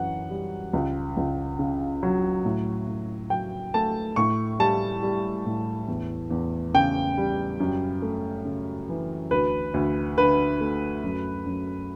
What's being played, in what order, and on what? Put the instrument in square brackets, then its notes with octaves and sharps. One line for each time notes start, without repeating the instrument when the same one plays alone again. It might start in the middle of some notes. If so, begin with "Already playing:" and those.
Already playing: [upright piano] F#2 E3 F#5
G3
C#2
C#2
C#3
F#3
A2
A2
F#3 G5
A3 A5
A2 C#6
G3 A5
G3
A2
E2
E2
C#3 G5
G3
F#2
A3
C#3
E3
D2 B4
D2
D3 B4
A3
F#2
F#2